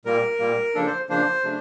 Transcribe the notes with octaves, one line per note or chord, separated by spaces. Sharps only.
A#2 G3 A#3 A#4
A#2 G3 A#3
C#3 F3 A#3 D4 A4
C5
C#3 F3 A#3 D4 C5
C#3 F#3 A3 D4